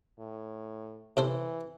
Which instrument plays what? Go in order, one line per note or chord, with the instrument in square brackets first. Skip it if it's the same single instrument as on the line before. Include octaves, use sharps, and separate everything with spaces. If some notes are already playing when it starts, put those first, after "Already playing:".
[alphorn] A2
[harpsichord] C3 A4 C5 [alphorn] E3